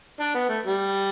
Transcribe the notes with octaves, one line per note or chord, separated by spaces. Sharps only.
D4
B3
A3
G3